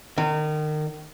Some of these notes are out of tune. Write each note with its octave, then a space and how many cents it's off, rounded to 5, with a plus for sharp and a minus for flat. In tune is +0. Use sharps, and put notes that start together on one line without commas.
D#3 -30